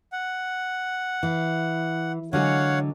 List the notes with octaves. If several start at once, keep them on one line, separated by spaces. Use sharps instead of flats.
F#5
E3
D3 F#3 G#3 C#5 F5 F#5